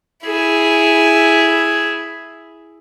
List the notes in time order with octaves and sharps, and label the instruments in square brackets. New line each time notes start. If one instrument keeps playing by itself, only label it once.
[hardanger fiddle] E4 G#4